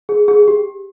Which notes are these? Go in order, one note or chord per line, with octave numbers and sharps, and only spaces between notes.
G#4
G#4
G#4
G4